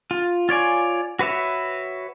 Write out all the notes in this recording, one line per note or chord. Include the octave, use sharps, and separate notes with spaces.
F4
F4 C#5 D5 G#5
F#4 B4 C#5 E5